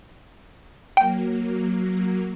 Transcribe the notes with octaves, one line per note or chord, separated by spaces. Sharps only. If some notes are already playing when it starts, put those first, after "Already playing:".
F#3 A#3 G5